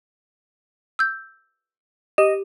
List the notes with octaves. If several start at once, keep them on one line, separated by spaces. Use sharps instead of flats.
E6 G6
G4 D#5